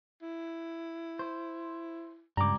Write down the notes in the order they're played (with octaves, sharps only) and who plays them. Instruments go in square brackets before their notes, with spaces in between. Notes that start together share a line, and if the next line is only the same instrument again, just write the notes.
[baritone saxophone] E4
[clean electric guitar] C5
[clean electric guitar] C#2 G3 [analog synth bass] G2 [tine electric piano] A#5 D6